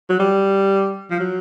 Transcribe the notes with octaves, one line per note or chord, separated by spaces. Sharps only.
F#3
G3
F3
F#3